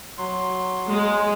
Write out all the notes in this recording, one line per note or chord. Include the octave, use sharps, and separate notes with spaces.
F#3 C6
G#3